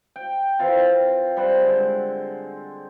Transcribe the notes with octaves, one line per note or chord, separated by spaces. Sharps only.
G5
E3 C4 F4
G3 C5 F#5
D3 G#3